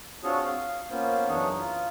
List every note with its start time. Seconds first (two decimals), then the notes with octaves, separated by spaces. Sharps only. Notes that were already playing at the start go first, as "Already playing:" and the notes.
0.23 C4 D4 F4 F#4 G#4 C#5
0.45 F5
0.90 A#3 B3 C#4 F4 C5
1.28 F#2 E3 D4 D#4 G#4 C#5
1.58 F4